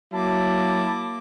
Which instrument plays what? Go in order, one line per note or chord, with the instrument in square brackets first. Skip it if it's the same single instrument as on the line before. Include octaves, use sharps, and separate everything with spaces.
[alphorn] F#3 [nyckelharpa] A#3 D6 [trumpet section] E4 A5